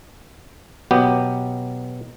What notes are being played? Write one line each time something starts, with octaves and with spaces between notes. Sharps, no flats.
B2 F#3 B3 G4